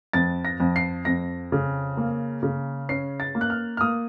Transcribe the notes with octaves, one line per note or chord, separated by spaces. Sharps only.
F2 A6
A#6
F2
C7
F2 A#6
C#3
A#3
C#3
C#4 C7
A6
A#3
F#6
F6
F6
A#3 D#6